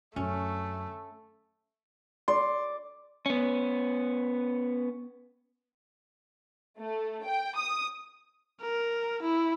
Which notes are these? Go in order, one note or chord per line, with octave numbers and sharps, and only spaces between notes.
F#2 D3 A3 C#4
D5 C6
B3 C#4
A3
G5
D#6
A#4
E4